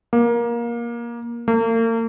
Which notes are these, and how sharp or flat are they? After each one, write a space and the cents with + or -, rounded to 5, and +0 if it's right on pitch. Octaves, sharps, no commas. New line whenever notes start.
A#3 +20
A#3 -40